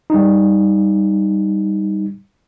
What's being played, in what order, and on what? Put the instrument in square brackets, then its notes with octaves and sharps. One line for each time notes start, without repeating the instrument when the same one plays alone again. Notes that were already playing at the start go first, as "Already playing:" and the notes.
[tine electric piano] G3 D#4